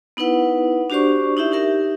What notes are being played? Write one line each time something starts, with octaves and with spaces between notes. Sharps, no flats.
B3 D#4 E4 B4 F#5
D4 F#4 G4 C5 D5 C#6
D#4 E4 G4 E5
D#4 G4 A#4 E5